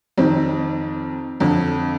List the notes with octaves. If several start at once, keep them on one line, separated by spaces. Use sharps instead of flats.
F2 D#3 C4
F2 D3